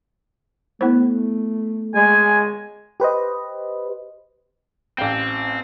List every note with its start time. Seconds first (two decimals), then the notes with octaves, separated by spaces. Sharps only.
0.81 A3 B3 E4 C5
1.95 G#3 G#5
3.00 G4 B4 C5 D#5
4.98 A1 C4 F5 G5